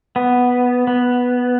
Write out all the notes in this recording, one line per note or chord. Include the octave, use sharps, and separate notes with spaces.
B3
B3